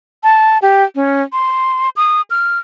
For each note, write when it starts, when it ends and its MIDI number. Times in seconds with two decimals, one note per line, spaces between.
0.23 0.58 81
0.62 0.84 67
0.95 1.22 61
1.33 1.89 84
1.96 2.22 87
2.30 2.59 89